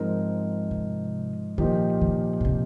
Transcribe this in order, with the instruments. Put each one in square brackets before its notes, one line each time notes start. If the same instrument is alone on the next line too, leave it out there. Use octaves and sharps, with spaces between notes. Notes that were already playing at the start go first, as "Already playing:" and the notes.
Already playing: [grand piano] G#2 F3 C4 D#4 A#4
[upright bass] C3
[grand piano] A#2 F3 A#3 D#4 G4 [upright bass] D#3
[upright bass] D#3
A#2
C3